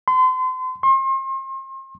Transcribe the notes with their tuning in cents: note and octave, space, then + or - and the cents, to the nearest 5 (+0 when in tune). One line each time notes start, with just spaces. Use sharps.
C6 -35
C6 +40